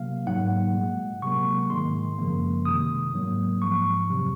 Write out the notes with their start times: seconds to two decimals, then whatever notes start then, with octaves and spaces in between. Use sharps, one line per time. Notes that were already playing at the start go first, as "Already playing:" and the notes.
Already playing: C3 F#3 A#3 F5
0.26 G#2 F#3 A#3 F#5
0.74 A#2 G#3
1.22 C3 F#3 A#3 C#6
1.70 G#2 D#3 G#3 C6
2.18 F#2 C#3 F3 A#3
2.65 C3 D#3 G#3 D#6
3.14 G#2 F#3 A#3
3.62 G#2 F3 G#3 C#6
4.10 F2 C3 F#3